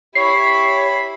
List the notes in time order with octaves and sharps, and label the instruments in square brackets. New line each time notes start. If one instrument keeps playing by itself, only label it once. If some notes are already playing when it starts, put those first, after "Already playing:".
[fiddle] E4 B5 [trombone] G4 [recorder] C#5 [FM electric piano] C7